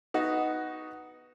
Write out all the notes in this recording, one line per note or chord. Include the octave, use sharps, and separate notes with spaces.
B3 D#4 F#4